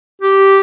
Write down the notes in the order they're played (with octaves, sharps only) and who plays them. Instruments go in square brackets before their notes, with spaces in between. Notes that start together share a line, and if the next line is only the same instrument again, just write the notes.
[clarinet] G4